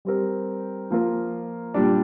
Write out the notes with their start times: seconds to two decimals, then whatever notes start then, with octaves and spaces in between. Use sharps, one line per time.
0.05 G3 C4 G4 A#4
0.91 F3 A#3 F4 A#4
1.74 A#2 G3 D4